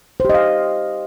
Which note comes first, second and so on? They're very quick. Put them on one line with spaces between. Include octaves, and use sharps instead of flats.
C5 G4 D#5 F5